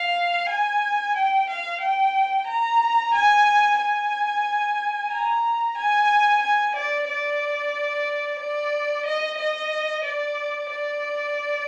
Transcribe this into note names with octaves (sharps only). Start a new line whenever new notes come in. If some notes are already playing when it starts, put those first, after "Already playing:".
Already playing: F5
G#5
G5
F5
G5
A#5
G#5
G#5
A#5
G#5
G#5
D5
D5
D5
D#5
D#5
D5
D5